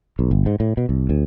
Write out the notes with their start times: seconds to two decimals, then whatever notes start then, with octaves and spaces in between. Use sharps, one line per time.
0.19 B1
0.31 G1
0.46 G#2
0.60 A2
0.77 B2
0.89 C2
1.09 D2